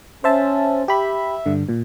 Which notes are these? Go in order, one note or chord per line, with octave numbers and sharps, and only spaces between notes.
C#4 C5 E5 A5
G4 E5 B5
G2 D3
A#2